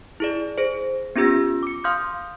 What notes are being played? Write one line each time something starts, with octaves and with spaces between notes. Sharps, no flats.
E4 G#4 D5
G#4 C5
B3 C#4 F4 G4 E6 A#6
D6 C#7
F5 C6 D#6 F6 G6